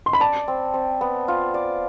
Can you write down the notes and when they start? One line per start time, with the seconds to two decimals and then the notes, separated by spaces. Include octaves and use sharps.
0.06 C6
0.13 B5
0.20 D5 A5
0.48 C4
0.74 C4
1.01 B3
1.28 F4
1.54 D5